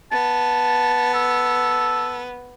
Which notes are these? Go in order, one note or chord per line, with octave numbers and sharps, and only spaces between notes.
B3 A5
A4